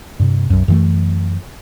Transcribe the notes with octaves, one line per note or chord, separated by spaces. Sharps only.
G2 C3
B1 F#2
F#2 E3 A3